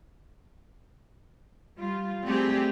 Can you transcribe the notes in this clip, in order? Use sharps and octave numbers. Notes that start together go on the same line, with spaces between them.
G3 F4
G3 A3 C4 G4 G#4